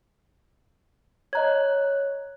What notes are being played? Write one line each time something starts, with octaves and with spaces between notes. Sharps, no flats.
C#5 D#5 A#5 F#6 G#6